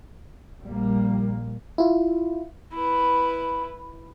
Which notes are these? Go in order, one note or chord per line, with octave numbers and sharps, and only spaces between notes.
A#1 G3 A#3
E4 F4
E4 B4